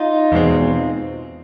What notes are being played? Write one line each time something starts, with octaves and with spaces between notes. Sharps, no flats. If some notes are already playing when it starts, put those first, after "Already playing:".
Already playing: D#4 F4
E2 B2 G#3 C4